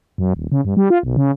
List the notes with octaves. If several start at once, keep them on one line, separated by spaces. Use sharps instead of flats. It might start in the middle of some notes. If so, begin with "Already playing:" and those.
F#2
D#1
C#3
G2
G3
F4
B1
C#3